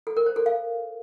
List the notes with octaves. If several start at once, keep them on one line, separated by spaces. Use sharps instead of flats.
A4
A#4
C5
A4
F5